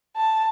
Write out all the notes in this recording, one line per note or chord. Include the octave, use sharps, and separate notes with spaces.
A5